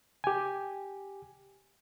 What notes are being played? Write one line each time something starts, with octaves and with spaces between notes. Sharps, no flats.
G4 G#5